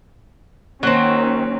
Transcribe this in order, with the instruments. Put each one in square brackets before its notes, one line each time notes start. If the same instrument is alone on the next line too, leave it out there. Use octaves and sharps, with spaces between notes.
[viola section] D#3 C#4 [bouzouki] F#3 C4 [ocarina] A#3